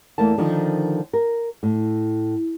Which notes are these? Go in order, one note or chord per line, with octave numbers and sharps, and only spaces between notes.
E2 A3 A#3 A5
D3 D#3 F3 D#4
A#4
A2